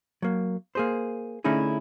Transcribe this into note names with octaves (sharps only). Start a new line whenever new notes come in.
F#3 A#3
A#3 G#4 C5
D3 A3 C#4 D#4 E4 G#4